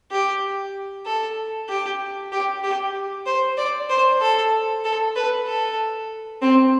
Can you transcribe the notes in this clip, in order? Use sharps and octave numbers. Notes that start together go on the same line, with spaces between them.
G4
A4
G4
G4
G4
C5
D5
C5
A4
A4
B4
A4
C4